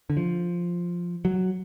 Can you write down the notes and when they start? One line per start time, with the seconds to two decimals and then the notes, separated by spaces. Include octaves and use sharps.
0.10 D3
0.17 F3
1.25 F#3